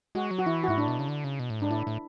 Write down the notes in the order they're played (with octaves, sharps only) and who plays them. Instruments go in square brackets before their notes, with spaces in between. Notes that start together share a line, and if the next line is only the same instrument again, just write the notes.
[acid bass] G#3 [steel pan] F#4
[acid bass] F#3
[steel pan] F#4
[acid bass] E3 [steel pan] E4
[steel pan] F#4
[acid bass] G#2 [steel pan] E4
[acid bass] A2 [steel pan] D4
[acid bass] B2
C#3
D3
C#3
B2
A2
[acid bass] G#2 [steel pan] D4
[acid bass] A2 [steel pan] E4
[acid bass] A2